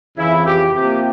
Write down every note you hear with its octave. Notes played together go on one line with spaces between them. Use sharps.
F2 C#3 E3 E4
G4
C3 F3 A#3 G4